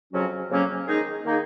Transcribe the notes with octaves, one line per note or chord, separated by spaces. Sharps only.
F2 C#3 F#3 C#4 F#4
F2 C#3 F#3 A#3 C#4
D#3 G#3 D#4 G#4
D#3 A#3 D#4 G#4